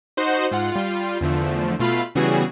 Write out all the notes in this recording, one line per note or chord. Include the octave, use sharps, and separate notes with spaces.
D#4 F#4 C5 D#5 F#5
G#2 F4 F#5
G3 F4
E2 D3 F3 A3
B2 A3 F4 F5 B5
C#3 E3 G3 B3 F#4 G#4